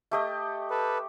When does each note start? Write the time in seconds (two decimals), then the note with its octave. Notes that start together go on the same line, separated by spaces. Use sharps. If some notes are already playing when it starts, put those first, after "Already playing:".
0.11 A3 G4 D#5
0.70 A4 B4